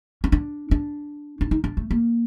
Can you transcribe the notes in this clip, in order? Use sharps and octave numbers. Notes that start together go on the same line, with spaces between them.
C#4
D4
D4
D4
D#4
D4
A3
A#3